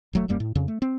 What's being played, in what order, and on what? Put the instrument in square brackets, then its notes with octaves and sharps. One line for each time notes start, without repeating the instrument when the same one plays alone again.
[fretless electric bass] D#1 F#3 A3
D#1 F#2 G3 A#3
A2
F2 C#3
A3
C4